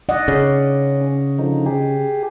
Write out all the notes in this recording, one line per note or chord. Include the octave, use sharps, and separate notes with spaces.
D5 D#5 F#5
C#3 C#4
D3 F3 D#4
G4 G#4